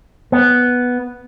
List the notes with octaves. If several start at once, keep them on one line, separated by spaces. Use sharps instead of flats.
B3